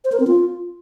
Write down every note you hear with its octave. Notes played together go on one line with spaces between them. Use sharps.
C5
A#4
C4
F4